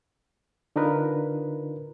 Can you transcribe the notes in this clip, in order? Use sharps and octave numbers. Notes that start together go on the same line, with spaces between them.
D3 D4 D#4 F4 A#4 B4